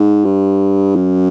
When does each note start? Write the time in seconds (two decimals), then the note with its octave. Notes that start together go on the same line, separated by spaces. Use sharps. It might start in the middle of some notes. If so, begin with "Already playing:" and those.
Already playing: G#2
0.25 G2
0.96 F#2